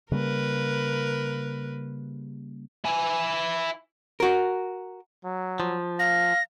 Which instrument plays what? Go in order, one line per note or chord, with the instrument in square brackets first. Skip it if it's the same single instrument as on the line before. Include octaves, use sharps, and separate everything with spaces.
[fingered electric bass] C#3 G3 A#3 [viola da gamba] A#4 B4
[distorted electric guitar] E4 G#5
[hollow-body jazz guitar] F#4 A#4
[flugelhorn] F#3
[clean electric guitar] F3
[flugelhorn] F5 [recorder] A#6